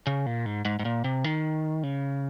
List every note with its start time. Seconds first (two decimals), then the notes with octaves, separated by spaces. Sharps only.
0.07 C#3
0.26 A#2
0.46 G#2
0.65 G#2
0.79 G#2
0.85 A#2
1.04 C3
1.24 D#3
1.83 C#3